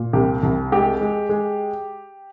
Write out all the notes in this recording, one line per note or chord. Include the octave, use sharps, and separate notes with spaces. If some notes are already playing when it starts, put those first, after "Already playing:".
Already playing: A#2
C2 G4
C2
G#3 G4
G#3
G#3